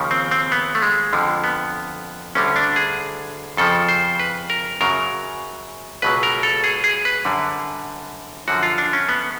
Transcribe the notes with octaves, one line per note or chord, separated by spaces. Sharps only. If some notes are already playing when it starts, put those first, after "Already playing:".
Already playing: D#2 C#3 F3
C4
C4
B3
A3
G#3
F2 D3 F3
B3
D2 D3 G3 C#4
D4
G#4
F2 C#3 F3 A4
C5
B4
A#4
F#2 C#3 F#3 A#4
C#2 B2 F#3 B4
A#4
A4
G#4
G#4
B4
F#2 D3 G3
F#2 D3 F3 F#4
F4
D4
C#4
B3